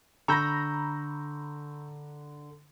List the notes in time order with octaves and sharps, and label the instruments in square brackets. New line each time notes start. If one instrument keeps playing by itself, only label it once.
[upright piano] D3 [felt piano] A#5 B5 A#6 [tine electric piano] C#6 E6 G6